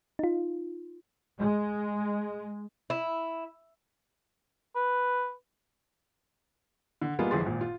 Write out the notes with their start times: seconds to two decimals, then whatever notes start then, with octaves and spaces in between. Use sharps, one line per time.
0.19 D#4 F4
1.40 G#3
2.90 E4
4.75 B4
7.02 D3
7.19 G3 G#3 A#3 B3 F4 G#4
7.31 G1 F2 E3 G#4 C6 A6
7.45 G#1 A#2
7.61 F4